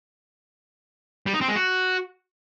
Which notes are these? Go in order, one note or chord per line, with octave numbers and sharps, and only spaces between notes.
G3
D#4
C4
G#3
F#4